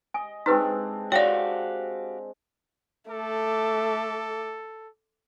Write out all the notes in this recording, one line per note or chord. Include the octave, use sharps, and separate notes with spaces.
D#5 G#5
G#3 C4 D4 D#4 G4 B4 A#5
F#4 G4 C#5 D5 F5 G5
A3 A4 D6